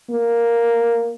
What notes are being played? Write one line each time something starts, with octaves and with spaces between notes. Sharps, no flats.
A#3